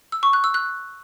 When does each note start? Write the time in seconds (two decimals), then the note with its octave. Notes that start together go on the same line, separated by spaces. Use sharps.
0.12 E6
0.23 C#6
0.33 F#6
0.44 E6
0.54 F#6